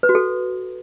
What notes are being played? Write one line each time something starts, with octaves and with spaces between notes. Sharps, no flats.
B4
F#4
A4